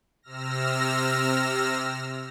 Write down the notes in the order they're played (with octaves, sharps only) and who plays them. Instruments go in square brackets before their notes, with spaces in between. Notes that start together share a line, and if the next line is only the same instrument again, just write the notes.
[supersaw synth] C3 E6 F6 A#6